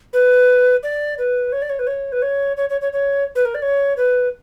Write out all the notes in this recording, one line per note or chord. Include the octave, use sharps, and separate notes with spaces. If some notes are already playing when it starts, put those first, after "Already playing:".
B4
D5
B4
C#5
D5
C#5
B4
C#5
B4
C#5
C#5
C#5
C#5
C#5
B4
A#4
D5
C#5
B4